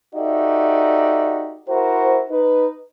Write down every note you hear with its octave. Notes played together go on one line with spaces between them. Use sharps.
D#4 F#4 G4 A4 D5 E5
E4 F#4 A#4 C5
D#4 B4